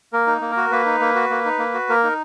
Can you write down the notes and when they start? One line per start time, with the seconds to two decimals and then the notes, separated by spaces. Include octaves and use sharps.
0.13 A#3 A#4
0.27 D#4
0.41 A#3
0.51 A#4
0.57 F#4
0.71 A#3 B4
0.86 D#4
1.01 A#3
1.15 F#4
1.30 A#3
1.45 D#4
1.59 A#3
1.74 F#4
1.89 A#3 A#4
2.03 D#4